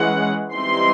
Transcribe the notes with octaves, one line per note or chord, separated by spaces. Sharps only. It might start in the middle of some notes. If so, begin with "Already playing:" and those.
Already playing: E3 G#3 C#4 F#5
E3 G3 C4 D#4 C6